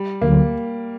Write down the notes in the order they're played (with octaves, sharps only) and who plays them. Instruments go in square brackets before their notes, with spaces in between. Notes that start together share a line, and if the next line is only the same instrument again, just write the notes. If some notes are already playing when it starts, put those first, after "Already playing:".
Already playing: [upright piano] G3
[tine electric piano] D2 D3 F#3 [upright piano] A#3